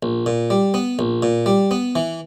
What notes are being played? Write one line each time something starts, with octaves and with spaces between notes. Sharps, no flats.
A#1
A#2
G3
B3
A#1
A#2
G3
B3
E3